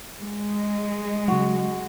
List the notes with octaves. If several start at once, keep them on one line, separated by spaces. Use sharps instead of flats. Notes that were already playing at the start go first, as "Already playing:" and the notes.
G#3
C#3 F#3 F#4